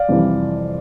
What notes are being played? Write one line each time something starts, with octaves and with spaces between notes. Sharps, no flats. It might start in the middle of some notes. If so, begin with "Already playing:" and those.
Already playing: D5 F5
F2 C3 E3 G3